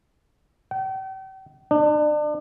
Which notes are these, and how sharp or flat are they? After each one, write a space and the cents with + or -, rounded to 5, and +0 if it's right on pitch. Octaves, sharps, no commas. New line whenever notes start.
G5 -40
D4 +35